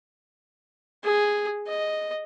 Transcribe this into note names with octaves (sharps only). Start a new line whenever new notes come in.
G#4
D#5